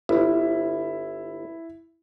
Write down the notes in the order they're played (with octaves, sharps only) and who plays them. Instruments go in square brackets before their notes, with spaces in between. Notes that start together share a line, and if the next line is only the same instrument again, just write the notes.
[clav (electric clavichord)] G1 [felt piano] E4